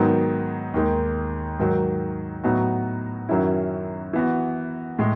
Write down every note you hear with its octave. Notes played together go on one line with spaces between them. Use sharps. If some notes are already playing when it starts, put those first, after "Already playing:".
Already playing: G#2 D#3 F#3 B3
D#2 D#3 G#3
G#2 D#3 F#3
A2 F#3 B3 D#4 F#4
F#2 D#3 F#3 C#4 E4
E3 B3 F#4
A2 G#3